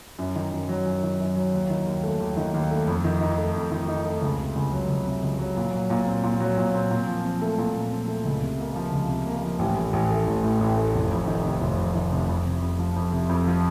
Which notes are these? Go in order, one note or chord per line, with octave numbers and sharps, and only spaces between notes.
F#2
D#3
F#2
F#3
F#2
D#3
F#2
F#3
D#2
D#3
D#2
A3
D#2
D#3
D#2
A3
F2
D#3
D#4
A3
F2
D#3
D#4
A3
C#2
C3
C#2
F#3
C#2
C3
C#2
F#3
A#2
F#3
A#2
C4
A#2
F#3
A#2
C4
A#2
F3
C4
A3
A#2
F3
C4
A3
C#2
C3
A#3
F3
C#2
C3
A#3
F3
A1
A2
A1
A3
A1
A2
A1
A3
F1
F2
D#3
C3
F1
F2
D#3
C3
F2
C3
F2
F3
F2
C3
F2
F3